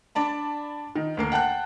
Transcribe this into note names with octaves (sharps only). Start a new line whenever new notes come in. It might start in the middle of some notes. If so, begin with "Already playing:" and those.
D4 D5 A5 B5
D#3
D2 A#3 C7
F#5 G5 A5 F#6